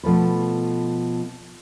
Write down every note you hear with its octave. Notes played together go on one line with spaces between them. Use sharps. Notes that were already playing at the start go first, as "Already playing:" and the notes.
B2 F3 A3 B4